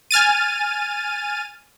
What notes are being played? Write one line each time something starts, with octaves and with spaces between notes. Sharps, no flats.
G#5 F6 A6 D#7